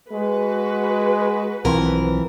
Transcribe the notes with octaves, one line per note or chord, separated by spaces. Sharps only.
G#3 F#4 B4
B1 E3 F3 C4 A#4